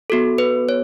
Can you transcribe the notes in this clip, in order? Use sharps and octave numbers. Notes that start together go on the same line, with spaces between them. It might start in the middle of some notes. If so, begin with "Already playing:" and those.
B3 F#4 A4
B4
C#5